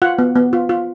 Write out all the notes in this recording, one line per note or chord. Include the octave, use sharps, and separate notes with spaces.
F4 F#5
B3
B3
F4
F4